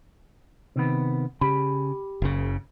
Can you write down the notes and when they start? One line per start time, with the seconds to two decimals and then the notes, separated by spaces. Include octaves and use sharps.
0.76 C3 D#3 B3
1.41 C#3 G4 B5
2.22 F#1 C#3